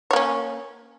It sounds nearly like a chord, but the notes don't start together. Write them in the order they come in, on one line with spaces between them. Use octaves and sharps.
C#5 A#3 C#4